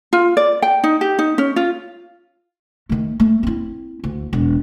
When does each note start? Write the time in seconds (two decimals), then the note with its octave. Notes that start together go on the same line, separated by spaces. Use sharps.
0.13 F4
0.37 D5
0.62 G5
0.84 D#4
1.01 G4
1.19 D#4
1.38 C#4
1.56 F4
2.89 D#3 A3
3.20 A3
3.43 C4 E4
4.04 D2
4.33 E1